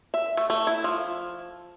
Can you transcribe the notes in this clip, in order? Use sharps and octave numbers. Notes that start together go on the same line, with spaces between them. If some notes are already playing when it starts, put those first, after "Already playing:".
E5
A3
A3
E4
F3